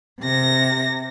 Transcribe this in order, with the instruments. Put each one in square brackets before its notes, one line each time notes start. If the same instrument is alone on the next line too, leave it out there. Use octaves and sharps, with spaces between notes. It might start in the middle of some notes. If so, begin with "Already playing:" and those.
[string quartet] C3 A#6